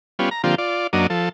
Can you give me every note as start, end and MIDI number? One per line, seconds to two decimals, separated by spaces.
0.19 0.29 55
0.19 0.29 59
0.19 0.29 61
0.19 0.29 65
0.31 0.42 82
0.44 0.55 50
0.44 0.55 53
0.44 0.55 58
0.44 0.55 60
0.44 0.55 65
0.44 0.55 67
0.58 0.87 65
0.58 0.87 74
0.93 1.07 42
0.93 1.07 54
0.93 1.07 58
0.93 1.07 62
0.93 1.07 75
1.10 1.29 53
1.10 1.29 69